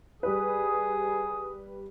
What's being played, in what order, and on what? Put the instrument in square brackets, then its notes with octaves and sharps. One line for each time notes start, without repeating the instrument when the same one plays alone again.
[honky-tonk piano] G3 B4 [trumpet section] G#4 D#6